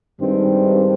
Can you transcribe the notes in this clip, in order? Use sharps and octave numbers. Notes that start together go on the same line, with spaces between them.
G2 D#3 G#3 C4